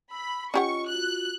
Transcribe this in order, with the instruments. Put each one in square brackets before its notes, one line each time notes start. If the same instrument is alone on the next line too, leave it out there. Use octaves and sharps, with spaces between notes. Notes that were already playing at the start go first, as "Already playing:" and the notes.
[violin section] B5 [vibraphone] E6
[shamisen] C#4 G4 F#5 [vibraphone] F4 D#5 [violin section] C#6
[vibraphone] F4 F#4 [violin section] F#6